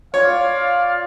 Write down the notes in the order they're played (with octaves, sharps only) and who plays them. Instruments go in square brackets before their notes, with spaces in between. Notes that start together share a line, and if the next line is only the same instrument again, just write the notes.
[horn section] F4 D5 F5 [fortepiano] C#5